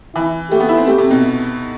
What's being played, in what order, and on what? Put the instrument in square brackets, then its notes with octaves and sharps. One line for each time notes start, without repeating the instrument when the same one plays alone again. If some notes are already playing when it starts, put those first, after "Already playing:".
[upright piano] E3 [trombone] E4
[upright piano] A3 [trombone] G4
[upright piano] B3
E4
C4
[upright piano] A3 [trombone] G4
[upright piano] C3
B2